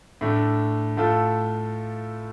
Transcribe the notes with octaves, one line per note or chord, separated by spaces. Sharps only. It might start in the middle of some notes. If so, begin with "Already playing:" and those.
A2 A3 D4
A2 A3 F4 A4